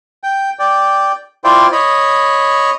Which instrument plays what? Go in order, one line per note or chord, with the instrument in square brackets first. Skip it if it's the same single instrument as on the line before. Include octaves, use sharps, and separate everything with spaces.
[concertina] G5
D5 G5
E4 F4 C5 D5 G5
C#5 D#5 B5